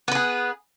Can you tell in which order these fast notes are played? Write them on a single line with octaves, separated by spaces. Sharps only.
B3 B4 G#4